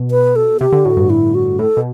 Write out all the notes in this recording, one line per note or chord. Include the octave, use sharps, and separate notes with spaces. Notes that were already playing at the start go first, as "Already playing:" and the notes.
Already playing: B2
B4
A4
C3 G4
D3
A2 F#4
G2
E4
F#4
A2 A4
B2